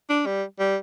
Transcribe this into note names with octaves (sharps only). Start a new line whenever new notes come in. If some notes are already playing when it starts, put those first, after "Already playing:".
D4
G3
G3